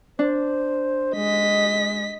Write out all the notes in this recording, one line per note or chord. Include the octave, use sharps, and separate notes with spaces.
D4 C5
G#3 D#5 B6